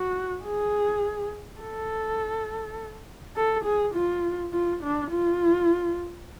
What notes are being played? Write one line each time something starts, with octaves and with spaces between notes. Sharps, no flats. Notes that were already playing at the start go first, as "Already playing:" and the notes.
Already playing: F#4
G#4
A4
A4
G#4
F4
F4
D4
F4